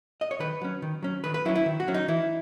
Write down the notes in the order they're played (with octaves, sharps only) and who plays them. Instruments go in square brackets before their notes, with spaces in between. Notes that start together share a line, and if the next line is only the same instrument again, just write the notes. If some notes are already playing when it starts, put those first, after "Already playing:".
[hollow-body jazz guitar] D#5
C#5
D#3 B4
F#3 C#4
D#3
F#3 C#4
D#3 B4
B4
F#3 C#4 E4
E4
D#3
F#4
F#3 C#4
D#4
E3 E4